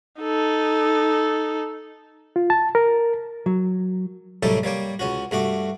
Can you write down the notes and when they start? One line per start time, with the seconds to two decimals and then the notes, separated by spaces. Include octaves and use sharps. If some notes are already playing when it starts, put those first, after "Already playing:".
0.21 D#4 A4
2.36 F4
2.50 A5
2.75 A#4
3.46 F#3
4.43 F#2 A2 G3 D#4 A4 G5
4.63 G3 A#3 C#5 G5
4.99 C#2 C#4 F#4
5.31 G2 A3 F#4 D6